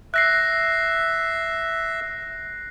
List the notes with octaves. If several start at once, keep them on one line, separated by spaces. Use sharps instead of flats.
E5 F#6 A#6 C7